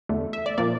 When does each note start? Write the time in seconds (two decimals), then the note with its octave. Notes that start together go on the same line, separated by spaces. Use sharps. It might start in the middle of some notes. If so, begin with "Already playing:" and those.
0.09 E2 D3 A3
0.33 E5
0.46 D5
0.58 A#2 F3 A#3 D5